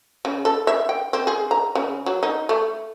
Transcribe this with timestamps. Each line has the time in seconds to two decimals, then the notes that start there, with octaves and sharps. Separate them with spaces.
0.25 C#3
0.45 A4
0.67 E5
0.89 G5
1.13 C4
1.27 G#4
1.51 A#5
1.75 C#3
2.06 F#3
2.23 D#4
2.49 A3